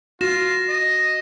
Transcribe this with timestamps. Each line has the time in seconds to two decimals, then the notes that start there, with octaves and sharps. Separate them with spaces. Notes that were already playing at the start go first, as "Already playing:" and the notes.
0.21 F4 F#4 A#6 E7
0.69 D#5